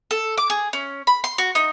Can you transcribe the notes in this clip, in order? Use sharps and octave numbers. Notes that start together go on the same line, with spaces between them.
A4
D6
G#4
C#4
B5
C6
F#4
D#4